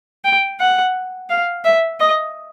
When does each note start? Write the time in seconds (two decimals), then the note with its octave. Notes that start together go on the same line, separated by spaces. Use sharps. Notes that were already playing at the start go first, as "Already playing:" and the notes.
0.24 G5
0.60 F#5
1.30 F5
1.65 E5
2.00 D#5